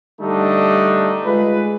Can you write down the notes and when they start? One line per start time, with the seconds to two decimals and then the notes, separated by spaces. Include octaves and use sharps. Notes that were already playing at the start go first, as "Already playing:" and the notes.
0.21 D3 G3 A3 D4 D#4
1.25 G#3 F4 B4